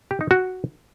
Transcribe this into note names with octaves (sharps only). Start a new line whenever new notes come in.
G4
D#4
F#4